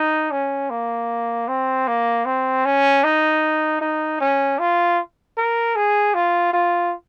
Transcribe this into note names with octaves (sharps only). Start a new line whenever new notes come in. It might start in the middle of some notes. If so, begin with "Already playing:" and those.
Already playing: D#4
C#4
A#3
C4
A#3
C4
C#4
D#4
D#4
C#4
F4
A#4
G#4
F4
F4